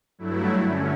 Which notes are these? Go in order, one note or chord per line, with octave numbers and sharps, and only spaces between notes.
G2 F#3 A3 E4
D3 C#4